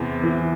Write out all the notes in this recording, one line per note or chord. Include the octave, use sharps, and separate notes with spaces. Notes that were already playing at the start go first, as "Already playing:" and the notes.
Already playing: E2 C3
E3